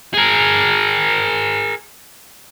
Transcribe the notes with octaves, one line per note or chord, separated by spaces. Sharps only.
G#4 A#4